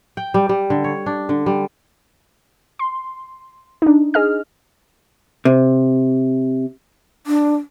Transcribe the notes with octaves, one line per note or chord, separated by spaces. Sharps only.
G5
G3
G3
D3
C#5
D4
D3
G3
C6
D4 D#4
G#4 D#5 F6
C3
D4